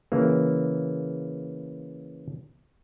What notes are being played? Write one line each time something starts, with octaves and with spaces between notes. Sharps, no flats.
C#3 E3 A#3